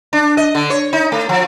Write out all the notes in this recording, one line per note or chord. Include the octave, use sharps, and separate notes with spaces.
D4
D#5
D3
C#5
D#4
A3
F3